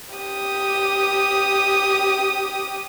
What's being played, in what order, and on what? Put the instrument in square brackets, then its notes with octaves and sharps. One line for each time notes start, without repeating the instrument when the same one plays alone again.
[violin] G4 D#6